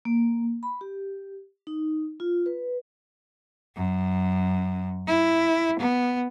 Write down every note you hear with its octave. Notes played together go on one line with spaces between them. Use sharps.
A#3
B5
G4
D#4
F4
B4
F#2
E4
B3